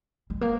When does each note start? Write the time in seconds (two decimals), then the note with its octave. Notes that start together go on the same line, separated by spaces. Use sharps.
0.30 G#3
0.41 A#3